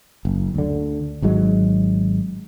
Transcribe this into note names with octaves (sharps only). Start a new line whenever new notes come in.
F#1
D2 D3
G#1 G#2 F#3 G#3